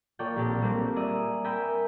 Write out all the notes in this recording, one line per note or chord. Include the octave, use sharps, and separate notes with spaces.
A#3 F4 A4 C#5 D5 G5
A#1 C4 G4 A4 D5
G3 A3 A#3 C4 D4
D5 E5 G#5 A#5 D6 D#6
A#4 E5 G5 G#5 B5 D#6